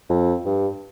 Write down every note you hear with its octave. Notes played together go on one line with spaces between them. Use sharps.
F2
G2